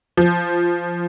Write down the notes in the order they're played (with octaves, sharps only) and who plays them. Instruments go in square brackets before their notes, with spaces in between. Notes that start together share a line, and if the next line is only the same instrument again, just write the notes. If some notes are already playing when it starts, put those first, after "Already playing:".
[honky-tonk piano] F3